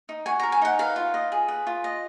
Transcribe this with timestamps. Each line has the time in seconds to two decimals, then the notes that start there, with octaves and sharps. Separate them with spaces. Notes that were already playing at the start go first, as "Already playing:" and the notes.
0.09 D#4
0.26 F#4 G#5
0.40 A#5
0.43 A#4
0.52 G#5
0.62 D#4 F#5
0.79 B4 F5
0.96 F4
1.14 D#5
1.32 G#4
1.48 B4
1.67 F4
1.84 D#5